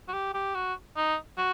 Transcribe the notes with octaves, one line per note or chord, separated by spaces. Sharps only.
F#4
G4
G4
F#4
D#4
F#4